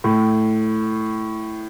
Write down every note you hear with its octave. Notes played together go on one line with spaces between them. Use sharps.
A2